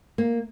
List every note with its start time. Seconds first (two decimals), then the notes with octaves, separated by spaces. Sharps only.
0.18 A#3